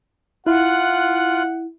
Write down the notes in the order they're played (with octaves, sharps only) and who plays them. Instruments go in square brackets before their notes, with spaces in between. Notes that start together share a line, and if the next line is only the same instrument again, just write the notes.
[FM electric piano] E4 [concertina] F4 F#6 [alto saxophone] F#5